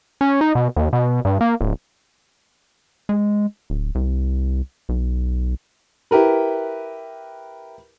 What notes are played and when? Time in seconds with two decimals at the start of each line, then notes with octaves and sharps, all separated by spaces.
0.21 C#4
0.41 D#4
0.55 B2
0.76 D#2
0.93 B2
1.25 G2
1.41 A#3
1.61 D1
3.09 G#3
3.70 D1
3.95 C2
4.89 B1
6.11 E4 G4 A#4 B4